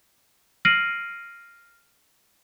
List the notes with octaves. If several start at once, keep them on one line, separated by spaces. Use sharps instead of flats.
F6 A#6 C7 D7 D#7 F#7